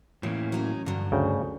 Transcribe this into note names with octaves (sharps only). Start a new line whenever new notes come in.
A2 E3 A#3 C#4
F#3 C#4 D#4
G2 D3 F#3
D2 C#3 G5